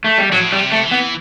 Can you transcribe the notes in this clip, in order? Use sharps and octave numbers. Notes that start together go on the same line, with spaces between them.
A3
G3
A2 F#3
G3
C3
A3
E3
B3